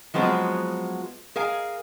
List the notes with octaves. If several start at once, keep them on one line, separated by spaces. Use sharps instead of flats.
F3 F#3 G#3 B3 C4 F4
G#4 A#4 F5 G#5